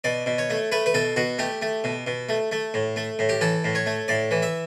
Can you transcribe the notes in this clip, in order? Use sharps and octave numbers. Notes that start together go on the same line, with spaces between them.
B2 D5
B2
C#5
A3
A3 B4
B4
B2 A4
B2 F#4
A3 G4
A3
B2
B2
A3
A3
A2
A3
A2
G4
E3 A4
A2
C#5
A3
A2 D5
E3
E5